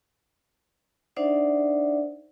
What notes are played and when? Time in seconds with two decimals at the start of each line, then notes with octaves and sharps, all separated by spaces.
1.16 D4 D#4 C5 D5 E5 F#5